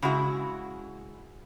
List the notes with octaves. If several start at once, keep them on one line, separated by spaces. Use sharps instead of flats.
C#3 G#3 E4 F#4